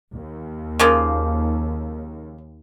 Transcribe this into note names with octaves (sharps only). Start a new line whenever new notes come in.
D#2
C#3 F3 A#3